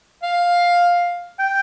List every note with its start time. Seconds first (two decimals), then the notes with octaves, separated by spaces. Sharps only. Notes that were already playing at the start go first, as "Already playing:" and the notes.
0.23 F5
1.40 G5